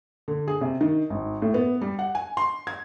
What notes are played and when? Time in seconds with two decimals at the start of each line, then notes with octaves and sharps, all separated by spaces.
0.28 D3
0.48 G#4
0.61 C3
0.81 D#3
1.10 G#1
1.42 A2
1.54 B3
1.81 G3
1.99 F#5
2.15 G#5
2.37 C6
2.67 G#6